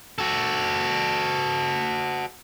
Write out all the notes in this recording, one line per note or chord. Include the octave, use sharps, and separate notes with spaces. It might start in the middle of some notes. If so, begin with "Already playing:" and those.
F#4 A4